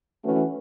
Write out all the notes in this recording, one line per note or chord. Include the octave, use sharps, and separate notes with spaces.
E3 A3 C#4 F#4 B4